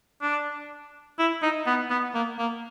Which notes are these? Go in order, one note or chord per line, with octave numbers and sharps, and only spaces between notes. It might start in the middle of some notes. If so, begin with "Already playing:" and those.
D4
E4
D#4
B3
B3
A#3
A#3